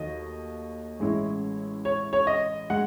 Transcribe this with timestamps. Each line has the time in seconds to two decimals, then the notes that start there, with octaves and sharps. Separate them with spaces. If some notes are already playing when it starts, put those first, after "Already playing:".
Already playing: D#2 D#3 F#3 A3 D#5
1.00 A1 A2 G#3 C#4 E4
1.85 C#5
2.13 C#5
2.27 D#5
2.70 G#3 F#5